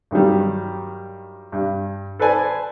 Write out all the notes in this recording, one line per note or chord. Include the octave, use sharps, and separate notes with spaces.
G2 D#3 F#3 G3
G2
A4 B4 C5 D5 G#5 A5